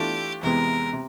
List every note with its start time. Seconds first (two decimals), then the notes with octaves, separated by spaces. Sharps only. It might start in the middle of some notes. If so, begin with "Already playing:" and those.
Already playing: E3 A3 D4 F4 G4
0.43 E2 C3 E3 G#3 B3 A#4
0.93 C3